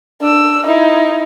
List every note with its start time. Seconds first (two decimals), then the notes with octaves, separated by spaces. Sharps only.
0.21 D4 E6
0.66 D#4 E4